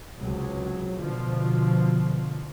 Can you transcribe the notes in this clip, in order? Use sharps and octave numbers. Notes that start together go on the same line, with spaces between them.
C#2 C3 F#3
B2 D3 F3